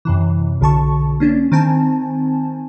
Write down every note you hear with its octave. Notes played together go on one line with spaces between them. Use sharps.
F#2 C3 E3
B1 D3 A5 C#6
A#3 C#4 D4
D#3 C4 G#5 A5